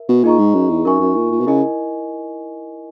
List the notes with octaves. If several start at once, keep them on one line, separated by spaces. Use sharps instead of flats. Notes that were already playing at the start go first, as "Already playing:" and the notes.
Already playing: A#4 E5
B2
A#2 D#4 G#4 D#5 A#5 C#6
G#2
F#2
E2
F#2 D#4 A#4 E5 G#5 C#6
F#2
A#2
A#2
B2
C#3 E4 A#4 D#5 G#5